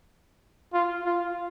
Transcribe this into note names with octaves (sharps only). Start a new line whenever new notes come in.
F4
F4